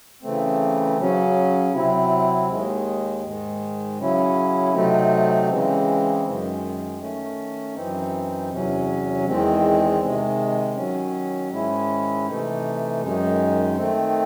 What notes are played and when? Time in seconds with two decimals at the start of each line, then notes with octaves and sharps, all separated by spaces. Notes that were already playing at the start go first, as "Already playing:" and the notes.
0.22 C#3 E3 A3 C4
0.97 C#3 F#3 C#4
1.72 C3 F#3 C4 E4
2.48 D#2 D#3 G#3
3.23 G#2 D#3 G#3
3.98 C#3 F#3 C#4 E4
4.73 C3 F#3 A3 C4 D#4
5.49 C#3 E3 G#3 C4
6.24 F#2 D#3 G#3
6.99 D#3 A3 C#4
7.74 F#2 E3 C4 D#4
8.50 E2 C3 F#3 C#4
9.25 E2 D#3 G#3 C4
10.00 C3 D#3 G#3
10.75 D#3 F#3 C#4
11.51 G#2 D#3 G#3 C#4 E4
12.26 C3 E3 A3 D#4
13.01 F#2 D#3 G#3 D#4
13.77 D#3 A3 C4